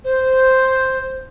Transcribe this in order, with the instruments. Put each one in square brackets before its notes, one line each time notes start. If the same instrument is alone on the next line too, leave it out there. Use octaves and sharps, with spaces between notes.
[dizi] C5